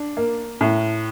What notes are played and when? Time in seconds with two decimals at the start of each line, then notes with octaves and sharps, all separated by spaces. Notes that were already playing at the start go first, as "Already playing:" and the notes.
Already playing: D4
0.17 A#3
0.61 A2